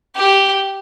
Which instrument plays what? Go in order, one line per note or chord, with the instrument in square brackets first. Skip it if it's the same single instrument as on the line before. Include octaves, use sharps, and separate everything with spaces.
[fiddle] G4